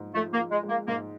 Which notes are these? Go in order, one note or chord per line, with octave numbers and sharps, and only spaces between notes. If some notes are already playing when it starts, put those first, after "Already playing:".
Already playing: G#2 F3 G#3
F3 A3
A#3
F3
G#3
G#3
A#3
G#2 A#3